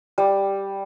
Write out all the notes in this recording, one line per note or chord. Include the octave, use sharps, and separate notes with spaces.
G3